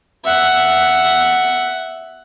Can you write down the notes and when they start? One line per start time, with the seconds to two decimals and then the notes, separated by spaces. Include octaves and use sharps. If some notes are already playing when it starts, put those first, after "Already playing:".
0.24 E5 F#5